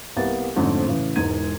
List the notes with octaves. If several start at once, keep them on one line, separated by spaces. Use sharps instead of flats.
C2 A#3 B3 G4 A6
F2 G#2 D3 A3 C4 C#4
A2 C#3 E3
E1 E2 G#2 D#4 G#6 D#7